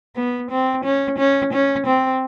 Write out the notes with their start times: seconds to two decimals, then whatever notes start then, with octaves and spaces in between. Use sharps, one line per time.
0.16 B3
0.51 C4
0.85 C#4
1.19 C#4
1.53 C#4
1.86 C4